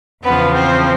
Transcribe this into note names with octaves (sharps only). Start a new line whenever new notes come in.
E2 C#3 F3 B3 B4
C4 C5